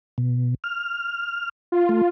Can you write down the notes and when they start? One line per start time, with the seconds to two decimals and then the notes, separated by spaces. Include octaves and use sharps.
0.18 B2
0.64 F6
1.72 F4
1.89 A3